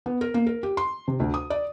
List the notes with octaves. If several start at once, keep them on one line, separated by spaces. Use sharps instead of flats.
B3
A#4
A#3
A#4
G4
C6
C3
D2
D#6
D5